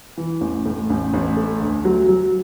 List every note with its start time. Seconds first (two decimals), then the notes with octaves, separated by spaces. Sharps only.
0.17 E3
0.41 A1
0.66 A2
0.90 A1
1.13 A1
1.37 A3
1.60 D2
1.85 F#3
2.08 F#3